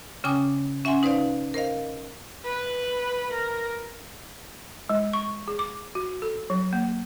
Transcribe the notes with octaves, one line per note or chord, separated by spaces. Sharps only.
C#3 C#4 G5 G#5 D6 D#6
C#4 E5 F#5 G#5 C6
D#4 B4 C5 D5 F5
A#4 C5 D#5 F5
B4
A#4
G#3
C#6
G#4
D6
F#4
A4
F#3
A#3